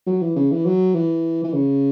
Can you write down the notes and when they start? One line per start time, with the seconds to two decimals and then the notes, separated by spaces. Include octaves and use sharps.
0.07 F#3
0.22 E3
0.36 C#3
0.51 E3
0.65 F#3
0.94 E3
1.44 E3
1.53 C#3